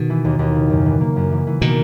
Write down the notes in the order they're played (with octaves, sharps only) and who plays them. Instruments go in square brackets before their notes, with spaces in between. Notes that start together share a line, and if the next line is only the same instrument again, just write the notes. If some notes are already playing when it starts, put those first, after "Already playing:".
Already playing: [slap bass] B2 D#3
[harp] E3
D#2
D#2
C#3
F#2
E3
A#3
F#2
E3
E3
[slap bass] B2 D#3 [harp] A#3